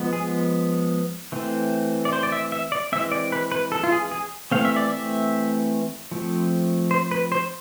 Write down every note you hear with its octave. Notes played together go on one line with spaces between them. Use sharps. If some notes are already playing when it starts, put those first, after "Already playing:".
Already playing: F3 G#3 B3
G#4
E3 A3 C4
D5
C5
D5
E5
E5
D5
E3 G#3 C4 E5
D5
B4
B4
A4
F4
G#4
G#4
E3 A3 C4 F5
E5
D5
E5
F3 A3 C4
C5
B4
C5